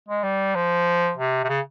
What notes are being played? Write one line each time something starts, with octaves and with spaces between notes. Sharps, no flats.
G#3
G3
F3
C3
C3
C#3